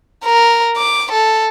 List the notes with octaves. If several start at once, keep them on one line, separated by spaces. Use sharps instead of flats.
A#4
D6
A4